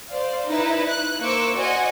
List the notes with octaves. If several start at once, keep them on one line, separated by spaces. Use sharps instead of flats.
C5 D5 F5
D#4 E4 B4
F#6
A#3 C5 C#6 D6 E6
F#4 C5 D5 D#5 F#5 G#5